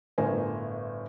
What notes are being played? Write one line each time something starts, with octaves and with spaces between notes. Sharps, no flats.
G1 A2 A#4 C5 G#5